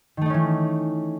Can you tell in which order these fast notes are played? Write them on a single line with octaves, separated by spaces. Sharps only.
D#3 A3 D#4 C#4 E3